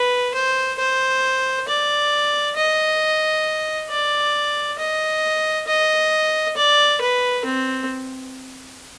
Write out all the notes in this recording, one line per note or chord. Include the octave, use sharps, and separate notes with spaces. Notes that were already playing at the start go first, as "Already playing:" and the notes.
Already playing: B4
C5
C5
D5
D#5
D5
D#5
D#5
D5
B4
C4